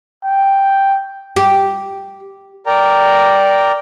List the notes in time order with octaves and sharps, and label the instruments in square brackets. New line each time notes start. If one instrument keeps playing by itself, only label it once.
[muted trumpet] G5
[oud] G4
[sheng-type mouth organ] A#4 D5 G5 A#5